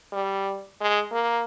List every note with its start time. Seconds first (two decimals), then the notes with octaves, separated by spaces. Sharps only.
0.12 G3
0.81 G#3
1.11 A#3